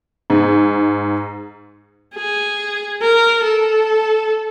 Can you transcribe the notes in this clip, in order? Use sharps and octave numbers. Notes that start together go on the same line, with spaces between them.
G#2
G#4
A#4
A4